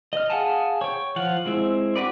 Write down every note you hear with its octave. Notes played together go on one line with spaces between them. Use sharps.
D#5 F6
G#4 F5 F#5 G#5 A5
C#5 G5
F3 F5 F#5
G#3 C4 E4
F#4 G4 B4 D5